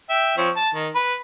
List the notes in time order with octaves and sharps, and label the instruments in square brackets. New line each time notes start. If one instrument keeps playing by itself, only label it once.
[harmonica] E5 G5
F3 C4 C#5
A5
D#3
B4